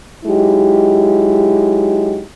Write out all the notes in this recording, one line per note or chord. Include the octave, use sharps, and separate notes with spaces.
F#3 G#3 D#4 E4 G4